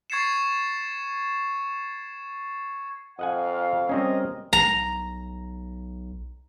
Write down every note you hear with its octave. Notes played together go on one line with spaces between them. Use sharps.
C#6 G#6 A6 C7 C#7 E7
F2 D#5 F5 F#5 G#5
G3 C4 C#4 A#4 D#5
B1 A#5